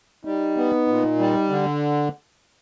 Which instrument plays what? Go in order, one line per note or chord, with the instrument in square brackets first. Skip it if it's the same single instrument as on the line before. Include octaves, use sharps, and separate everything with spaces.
[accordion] G3 [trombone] D#4
[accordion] B3
A#2
G3
D3